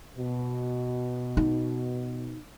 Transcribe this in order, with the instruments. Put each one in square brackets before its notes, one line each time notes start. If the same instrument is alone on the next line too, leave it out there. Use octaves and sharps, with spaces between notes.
[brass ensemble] B2
[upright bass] D#4